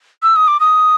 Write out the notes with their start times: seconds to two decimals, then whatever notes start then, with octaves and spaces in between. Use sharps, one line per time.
0.23 E6
0.36 D#6
0.48 D6
0.60 D#6